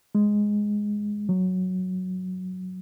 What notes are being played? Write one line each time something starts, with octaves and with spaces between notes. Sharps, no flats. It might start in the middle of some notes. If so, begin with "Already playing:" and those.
G#3
F#3